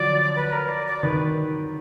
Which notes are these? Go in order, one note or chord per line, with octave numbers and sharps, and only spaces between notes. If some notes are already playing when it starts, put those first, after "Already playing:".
Already playing: D3 F3 F#3 D5
B4
A#4
D5
D5
D#3 B4